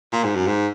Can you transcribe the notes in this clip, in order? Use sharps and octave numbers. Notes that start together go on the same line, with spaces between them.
A#2
G#2
F#2
G#2